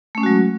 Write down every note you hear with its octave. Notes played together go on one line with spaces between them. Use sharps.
F#3 G#3 A3 C#4 F#4